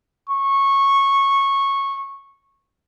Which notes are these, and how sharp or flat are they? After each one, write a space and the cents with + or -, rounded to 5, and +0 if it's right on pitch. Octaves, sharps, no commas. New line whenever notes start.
C#6 -15